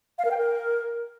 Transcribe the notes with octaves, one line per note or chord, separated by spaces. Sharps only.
F5
A#4
G5
A#4